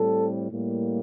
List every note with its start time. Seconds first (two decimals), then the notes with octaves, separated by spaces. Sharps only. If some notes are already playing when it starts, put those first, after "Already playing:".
Already playing: A2 G3 C4 A4
0.51 A2 G3 A#3